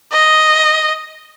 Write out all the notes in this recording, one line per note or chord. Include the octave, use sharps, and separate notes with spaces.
D#5